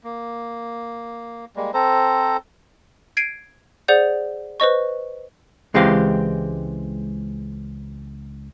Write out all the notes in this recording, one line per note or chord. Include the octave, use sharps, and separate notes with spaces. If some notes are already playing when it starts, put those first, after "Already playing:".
A#3
G3 G#3 A#3
C4 A4 C5 A#5
G#6 C7 D7 D#7
G#4 C5 D5 F#5 G6
B4 C5 D#5 C#6
C#2 E3 G#3 C4 G4 F5